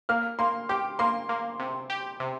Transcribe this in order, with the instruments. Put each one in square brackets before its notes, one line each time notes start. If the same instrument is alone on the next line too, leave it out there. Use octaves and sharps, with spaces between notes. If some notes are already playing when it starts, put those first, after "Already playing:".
[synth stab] A#3 [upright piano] F6
[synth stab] A#3 [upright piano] C6
[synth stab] G4 [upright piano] D6
[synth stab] A#3 [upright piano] C6
[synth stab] A#3
C3
G4
C3